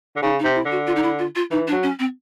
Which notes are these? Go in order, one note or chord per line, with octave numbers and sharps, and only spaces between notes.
D3
C#3 D#4
D#4
C3
E4
D3
F#4
F4
D#4
E4
F4
F4
E3 D#4
D4
F#3
C#4
C4